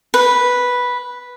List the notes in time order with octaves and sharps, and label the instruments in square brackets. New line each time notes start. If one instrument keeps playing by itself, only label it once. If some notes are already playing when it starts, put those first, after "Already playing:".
[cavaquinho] B4